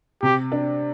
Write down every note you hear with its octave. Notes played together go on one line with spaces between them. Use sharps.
C3 G4
D4